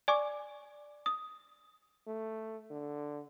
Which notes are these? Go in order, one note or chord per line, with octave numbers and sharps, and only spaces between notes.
D5 G#5 C#6 D6
D#6
A3
D3